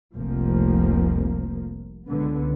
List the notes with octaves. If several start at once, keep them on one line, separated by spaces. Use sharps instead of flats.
F1 C2 F3 A#3
C#2 D3 B3